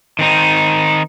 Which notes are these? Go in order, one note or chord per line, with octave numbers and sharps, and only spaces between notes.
D#3 C4 D#4